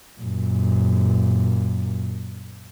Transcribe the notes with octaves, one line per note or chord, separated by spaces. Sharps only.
F#2 A#2